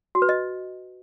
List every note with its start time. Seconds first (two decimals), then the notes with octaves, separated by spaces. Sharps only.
0.15 F#4
0.22 B4
0.29 D#5